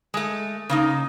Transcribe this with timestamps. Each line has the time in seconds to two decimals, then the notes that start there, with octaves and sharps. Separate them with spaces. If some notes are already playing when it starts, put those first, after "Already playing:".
0.14 G#3 A3
0.69 C#3 A#3 D#4